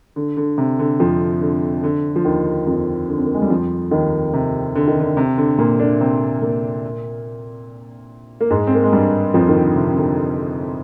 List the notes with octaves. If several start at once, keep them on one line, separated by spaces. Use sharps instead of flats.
D3
D3
C3
D3
F2 F3
D3
D3
F3
D#2 D#3
F2 F3
D3
C4
A#3
G#3
G3
F2 F3
D#2 D#3
C3
D3
D#3
D3
C3
D3
A#2 A#3
D3 D4
C3 C4
A#2 A#3
A#3
G#2 G#3
C4
A#3
G#3
G2 G3
F2 F3
D#3
D3
C3
C3
D3